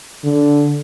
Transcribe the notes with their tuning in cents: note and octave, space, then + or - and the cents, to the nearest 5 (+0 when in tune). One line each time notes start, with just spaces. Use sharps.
D3 -15